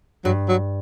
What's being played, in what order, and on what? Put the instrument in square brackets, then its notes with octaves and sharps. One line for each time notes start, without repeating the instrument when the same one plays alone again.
[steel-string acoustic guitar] G2 [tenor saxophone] F#3
[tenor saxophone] F#3